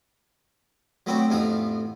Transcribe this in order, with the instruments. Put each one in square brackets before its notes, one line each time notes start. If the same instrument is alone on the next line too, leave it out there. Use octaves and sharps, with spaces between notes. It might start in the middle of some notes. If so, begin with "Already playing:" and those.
[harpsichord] F#3 A3 B3 C4 D4 F#4
A1 F2 D3 B3 F4 F5